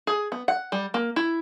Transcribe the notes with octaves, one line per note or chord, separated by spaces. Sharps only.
G#4
B3
F#5
G3
A#3
E4